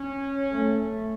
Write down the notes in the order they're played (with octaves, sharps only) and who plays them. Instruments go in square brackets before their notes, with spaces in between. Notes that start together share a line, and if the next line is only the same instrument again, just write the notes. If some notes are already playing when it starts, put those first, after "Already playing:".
Already playing: [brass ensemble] C#4
[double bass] A3